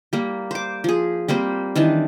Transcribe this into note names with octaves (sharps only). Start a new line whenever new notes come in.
G3 A#3
C5 D6
F3 G#4
G3 A#3 C4 C5
D#3 E3 D4 A5